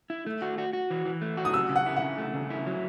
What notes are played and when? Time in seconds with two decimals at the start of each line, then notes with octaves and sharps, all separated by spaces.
0.10 E4
0.26 A3
0.42 F#4
0.58 F#4
0.73 F#4
0.90 E3
1.05 E3
1.22 A3
1.37 F#4
1.45 D#6
1.54 C#3 E6
1.70 C#3
1.76 F#5
1.86 E4
1.96 F#5
2.02 C#3
2.18 A3
2.34 C#3
2.50 E4
2.66 F#3